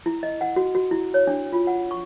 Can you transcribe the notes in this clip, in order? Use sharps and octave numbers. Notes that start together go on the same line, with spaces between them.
E4
D#5
F#5
F#4
F#4
E4
C#5
D4
F4
F#5
C#6